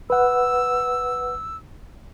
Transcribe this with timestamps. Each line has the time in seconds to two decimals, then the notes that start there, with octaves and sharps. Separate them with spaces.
0.10 B4 F#5 E6